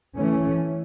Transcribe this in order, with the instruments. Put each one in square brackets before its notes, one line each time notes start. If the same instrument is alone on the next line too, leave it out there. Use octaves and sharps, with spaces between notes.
[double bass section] E3 A3 C#4